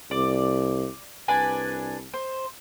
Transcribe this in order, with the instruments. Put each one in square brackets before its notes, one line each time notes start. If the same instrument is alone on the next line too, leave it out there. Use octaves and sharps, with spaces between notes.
[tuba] C2 [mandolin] D5
[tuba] C2 [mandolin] D4 B4 G#5
[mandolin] C5